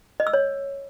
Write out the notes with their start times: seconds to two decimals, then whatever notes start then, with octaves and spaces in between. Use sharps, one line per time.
0.20 D#5
0.27 E6
0.33 C#5